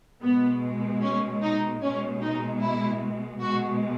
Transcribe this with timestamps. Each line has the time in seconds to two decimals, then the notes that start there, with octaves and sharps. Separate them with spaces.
0.23 B2 G#3 B3
1.02 C#4
1.42 D#4
1.82 B2 G#3 C#4
2.22 D#4
2.61 E4
3.40 B2 G#3 F#4